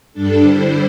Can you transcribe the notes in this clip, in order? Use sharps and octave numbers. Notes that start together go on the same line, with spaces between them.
G2 G3 D4 A4
D3 G3 E4 C5